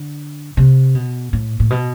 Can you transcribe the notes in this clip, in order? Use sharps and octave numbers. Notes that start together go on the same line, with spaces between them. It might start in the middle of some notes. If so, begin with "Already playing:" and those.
Already playing: D3
C3
B2
A2
A2
B2